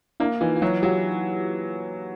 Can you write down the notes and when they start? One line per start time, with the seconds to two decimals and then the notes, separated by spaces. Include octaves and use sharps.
0.20 A#3 D4 E4
0.41 E3 D#4 F4
0.56 F4
0.62 F#3 E4 F#4
0.83 F#3 F4 G4